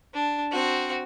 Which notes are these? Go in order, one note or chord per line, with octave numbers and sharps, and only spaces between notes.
D4
C4 F#4